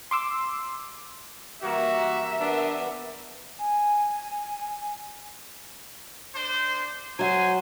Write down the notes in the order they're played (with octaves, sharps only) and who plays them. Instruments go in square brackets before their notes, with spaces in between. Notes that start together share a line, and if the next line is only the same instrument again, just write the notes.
[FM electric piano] C6 D6 E6
[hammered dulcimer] E3 G3 A#3 [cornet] F#4 [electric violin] E5
[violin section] B3 A#4 [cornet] D4
[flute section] G#5
[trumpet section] D4 C5
[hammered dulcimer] F#3 F#5 [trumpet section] C5 G#5